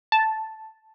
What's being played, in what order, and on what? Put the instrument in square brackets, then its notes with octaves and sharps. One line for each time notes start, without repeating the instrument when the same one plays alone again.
[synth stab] A5